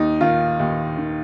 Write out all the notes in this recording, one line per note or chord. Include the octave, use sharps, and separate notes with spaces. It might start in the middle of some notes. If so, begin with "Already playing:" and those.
Already playing: D#2 D#4
D#3 F4
D#2
D#3